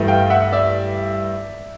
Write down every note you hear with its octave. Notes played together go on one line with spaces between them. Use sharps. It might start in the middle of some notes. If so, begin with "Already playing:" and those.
Already playing: G2 E3 A3
F5 G5
E5 F#5
D5 E5